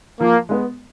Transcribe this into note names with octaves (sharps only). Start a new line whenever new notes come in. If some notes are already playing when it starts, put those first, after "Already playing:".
F3 A#3
G#3 B3